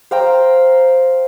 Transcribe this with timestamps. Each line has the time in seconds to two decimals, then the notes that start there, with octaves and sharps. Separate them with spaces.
0.11 C5 F5 G5 A#5